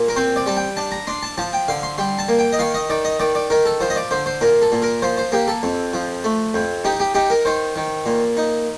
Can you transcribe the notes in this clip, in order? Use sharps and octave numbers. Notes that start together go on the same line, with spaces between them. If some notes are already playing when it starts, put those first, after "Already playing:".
Already playing: A#2
A#4
C4 C5
D5
G3 A5
G5
D4 A5
A#5
D4 C6
A5
F3 A5
G5
D3 F5
C6
G3 C6
A5
A#3
G5
D#5
D#3 F5
D#5
D#3 D5
D#5
D#3 D5
D5
D#3 A#4
A4
F3 C5
D#5
D5
D3 C5
C5
A#2 A#4
A4
A#2
A#4
F3 C5
C5
A#3 G4
A4
F2
F3
A3
F2
D#4 G4
G4
D#4 G4
A#4
D#3 C5
D#3
A#2
D#4